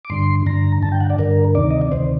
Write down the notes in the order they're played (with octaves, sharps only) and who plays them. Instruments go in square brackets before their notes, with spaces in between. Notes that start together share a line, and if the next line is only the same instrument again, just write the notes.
[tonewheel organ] D6
G2 D3 C6
G2 D3 A#5
G2 D3 A5
G5
F#5
D5
G2 D3 A#4
D2 C3 D#3 D5
D#5
D5
D2 C3 D#3 C5